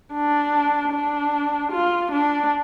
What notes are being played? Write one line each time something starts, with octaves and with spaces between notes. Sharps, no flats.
D4
D4
F4
D4